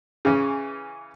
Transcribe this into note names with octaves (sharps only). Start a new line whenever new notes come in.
C#3 E3 C#4